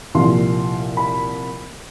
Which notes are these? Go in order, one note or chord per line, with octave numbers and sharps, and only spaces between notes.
C2 A#2 F3 C6
B5